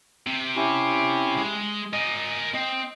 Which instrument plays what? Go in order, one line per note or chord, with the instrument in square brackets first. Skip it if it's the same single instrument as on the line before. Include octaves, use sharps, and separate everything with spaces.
[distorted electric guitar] C3
[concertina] C#4 E4 G4
[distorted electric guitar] G#3
[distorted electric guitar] A#4 G#5 [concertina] D#5
[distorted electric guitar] C4 [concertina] D#5